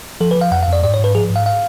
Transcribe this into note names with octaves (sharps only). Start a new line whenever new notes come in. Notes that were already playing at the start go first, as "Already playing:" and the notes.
F3 A4
B4
F3
F5
F2 F#5
F5
F2 D5
G#2 D5
C#5
G#2 B4
F3 G#4
G#2
F5
F5